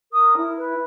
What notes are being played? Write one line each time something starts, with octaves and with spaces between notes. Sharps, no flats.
A#4 D#6
E4
B4